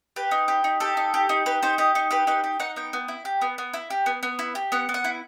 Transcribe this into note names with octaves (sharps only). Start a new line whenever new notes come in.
G4 B4
D#4
G4
D#4
G4 A4
D#4
G4
D#4
G4 B4
D#4 C5
G4 D#5
D#4
G4 B4
D#4 B4
G4
D#4 F#5
B3 G5
B3
E4
G4
B3
B3
E4
G4
B3
B3
E4
G4
B3 F#5
B3
F#5
E4